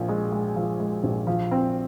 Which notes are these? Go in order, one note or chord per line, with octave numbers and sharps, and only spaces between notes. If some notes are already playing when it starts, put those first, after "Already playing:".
Already playing: A#1 A#2 F3
G#3
G#3
F3
G#3
A#1
F3
C4